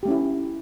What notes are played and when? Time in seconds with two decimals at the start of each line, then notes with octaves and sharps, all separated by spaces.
0.03 G4
0.05 A3
0.08 C#4
0.11 E4